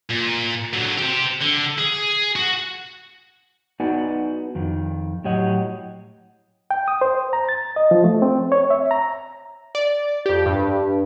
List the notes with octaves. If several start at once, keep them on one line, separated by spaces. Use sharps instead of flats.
A#2
D3 F#3
G4 C5
D3
G#4
F#4
B3 D#4 F#4 B4 D5 G#5
F2 D#3
A2 F#3 G4 C#5 D#5 F#5
G5
D#6
C5
A#5
A6
D#5
F3
A3
C4
C#5
E5
A#5
D5
F2 G4
G2